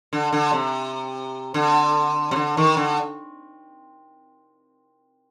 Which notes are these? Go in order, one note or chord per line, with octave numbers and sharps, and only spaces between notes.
D3
D3
C3
D3
C3
D3
D#3
D3